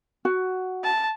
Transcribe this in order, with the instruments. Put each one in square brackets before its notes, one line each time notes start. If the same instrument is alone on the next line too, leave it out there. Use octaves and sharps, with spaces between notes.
[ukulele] F#4
[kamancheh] A5